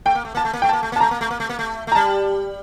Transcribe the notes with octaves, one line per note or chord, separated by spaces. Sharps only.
A3 G5
A#3
A3
A#3 A5
A3
A#3
A3 G5
A#3 A5
A3
A#3
A5
A3 A#5
A#3
A3
A#3
A3
A#3
A3
A3
A#5
G3 A5